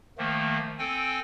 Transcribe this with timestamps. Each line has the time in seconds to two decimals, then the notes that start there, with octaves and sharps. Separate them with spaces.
0.18 D#3 F3 A3 A#3
0.78 C4 A4 G5 G#5